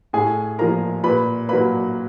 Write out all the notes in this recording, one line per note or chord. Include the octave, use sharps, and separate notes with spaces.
A2 G#4 G#5
F3 A#3 A#4 A#5
A#2 B4 B5
F#3 A#3 B4 B5